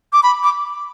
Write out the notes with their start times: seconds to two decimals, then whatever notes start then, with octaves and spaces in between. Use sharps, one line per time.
0.13 D6
0.23 B5
0.43 D6